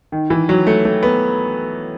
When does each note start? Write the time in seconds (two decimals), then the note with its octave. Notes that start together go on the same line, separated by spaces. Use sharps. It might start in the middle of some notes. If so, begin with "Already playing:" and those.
0.12 D#3
0.30 E3
0.49 F#3
0.67 A3
0.85 A3
1.03 B3